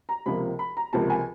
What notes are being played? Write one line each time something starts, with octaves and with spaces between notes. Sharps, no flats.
A#5
C#2 C3 F3 A#3 B5
B5
A#5
C#2 C3 F3 A#3 A5
G#5